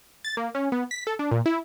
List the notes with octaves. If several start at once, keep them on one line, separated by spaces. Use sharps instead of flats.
A6
A#3
C#4
B3
B6
A4
D4
A#2
E4